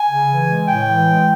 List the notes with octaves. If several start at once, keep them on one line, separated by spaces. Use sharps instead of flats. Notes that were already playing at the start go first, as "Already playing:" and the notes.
Already playing: G#5
C#3
E3
G#3
A2 G5
E3
G#3